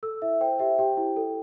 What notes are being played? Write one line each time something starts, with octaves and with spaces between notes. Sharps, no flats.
A4 E6
E4 E5
C5 G5
G4 E5
G4 G5
E4
A4